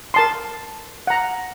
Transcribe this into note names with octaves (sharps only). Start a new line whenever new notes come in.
A#4 A5 C6
F#5 A#5